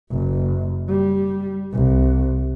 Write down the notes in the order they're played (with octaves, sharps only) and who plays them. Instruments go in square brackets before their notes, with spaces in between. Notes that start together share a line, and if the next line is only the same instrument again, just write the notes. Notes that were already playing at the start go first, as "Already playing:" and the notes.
[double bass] F#1
G3
C2